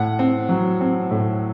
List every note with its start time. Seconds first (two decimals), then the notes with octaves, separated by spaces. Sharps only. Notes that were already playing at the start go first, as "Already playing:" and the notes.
Already playing: A2 F#5
0.19 C4
0.49 F#3
0.81 C4
1.11 A2